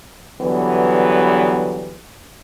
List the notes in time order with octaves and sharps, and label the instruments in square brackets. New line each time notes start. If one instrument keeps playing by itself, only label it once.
[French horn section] D3 E3 F#3 G3 B3